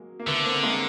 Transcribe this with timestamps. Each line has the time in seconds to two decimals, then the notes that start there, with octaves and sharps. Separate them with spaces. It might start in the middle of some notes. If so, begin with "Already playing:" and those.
Already playing: F#3 G#3 A#3
0.20 A#3
0.28 D3 A3 B3
0.45 A#3 C4
0.63 G#3 A#3